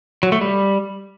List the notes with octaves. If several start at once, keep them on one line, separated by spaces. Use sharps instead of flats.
F#3
A3
G3